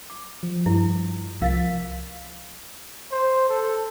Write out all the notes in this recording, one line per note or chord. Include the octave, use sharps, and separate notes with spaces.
D6
F3
G2 E4
C2 F3 A#4 F5 A6 B6
C5
A4